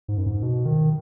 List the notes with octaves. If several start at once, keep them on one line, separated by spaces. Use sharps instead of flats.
G#2
F#2
G#2
B2
D#3